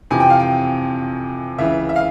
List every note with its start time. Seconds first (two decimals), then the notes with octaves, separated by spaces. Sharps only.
0.11 F2 C3 E3 G#5
0.20 G5
0.30 F5
0.40 G5
1.58 C#2 C#3 E3 E5
1.89 E5
1.96 F5